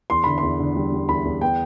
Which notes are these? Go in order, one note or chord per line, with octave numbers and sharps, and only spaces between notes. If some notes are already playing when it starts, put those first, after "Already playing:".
E2 C6
D3 B5
C6
E2
D3
G3
G3
E2 B5
E2
B3 G5